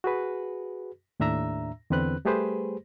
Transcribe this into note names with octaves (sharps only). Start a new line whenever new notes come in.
F#4 G#4 B4
D#2 A2 D4 E5 A#5 E6
E2 D3 C4 B4 F#6
G3 A3 G4 G#4 B4 C5